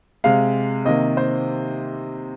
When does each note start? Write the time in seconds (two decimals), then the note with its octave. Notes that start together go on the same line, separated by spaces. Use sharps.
0.24 C3 G#3 F5
0.85 C3 D#3 A#3 D#5
1.17 C5